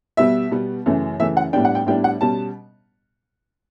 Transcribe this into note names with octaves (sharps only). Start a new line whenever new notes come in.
B2 G3 B3 E5
B2 G3 B3
F#2 C#3 E3 A3
F#2 C#3 E3 A3 E5
F#5
A2 G3 B3 D4 G5
F#5
G5
A2 G3 B3 D4 G5
F#5
B2 G3 C#4 A5